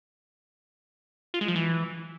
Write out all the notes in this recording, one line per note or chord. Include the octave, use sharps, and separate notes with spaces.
F4
G#3
F3
E3